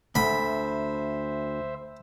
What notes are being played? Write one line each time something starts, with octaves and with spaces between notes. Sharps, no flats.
D2 C5 E5 B5